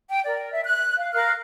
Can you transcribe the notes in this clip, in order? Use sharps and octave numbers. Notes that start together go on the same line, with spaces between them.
G5
A#4 D5
E5
F#6
F5
A#4 F5 F6 F#6